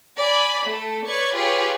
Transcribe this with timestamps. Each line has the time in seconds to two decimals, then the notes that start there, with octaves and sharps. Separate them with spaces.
0.18 D5 G#5 B5
0.67 A3 A4
1.07 B4 C#5 D5 C#6 G#6
1.37 F4 G4 G#4 B4 C#5